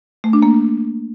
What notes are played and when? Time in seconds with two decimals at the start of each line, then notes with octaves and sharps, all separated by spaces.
0.24 A3
0.33 D4
0.43 A#3